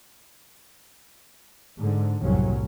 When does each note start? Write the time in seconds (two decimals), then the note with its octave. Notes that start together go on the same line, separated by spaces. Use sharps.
1.79 G#2 D3
2.21 F#1 C2 F2 A2 F#3 C#4